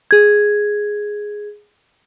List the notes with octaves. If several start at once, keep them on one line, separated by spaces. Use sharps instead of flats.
G#4 G#6